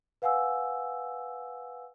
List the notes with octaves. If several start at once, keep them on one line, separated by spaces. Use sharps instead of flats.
B4 F5 F#5 G#5 E6